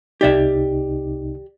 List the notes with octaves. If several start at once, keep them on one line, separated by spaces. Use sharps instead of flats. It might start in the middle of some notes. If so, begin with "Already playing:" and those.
C2 C3 D#4 G4 D5 E5